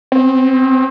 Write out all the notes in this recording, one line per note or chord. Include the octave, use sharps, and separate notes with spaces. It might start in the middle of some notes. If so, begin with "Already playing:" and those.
C4